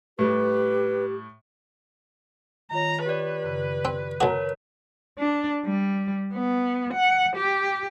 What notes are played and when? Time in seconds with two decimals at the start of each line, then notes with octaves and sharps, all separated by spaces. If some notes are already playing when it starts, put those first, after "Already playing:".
0.19 A2 G3 G4 B4
2.71 D#3 F4 C#5 A#5
3.06 G4 B4 C#5 D5
3.44 F#2 C#3
3.85 C4
4.21 B1 F#4 A#4 C#5 A5 A#5
5.18 D4
5.65 G3
6.33 B3
6.94 F#5
7.36 G4